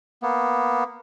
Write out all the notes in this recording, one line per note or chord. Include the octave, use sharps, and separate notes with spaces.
A#3 B3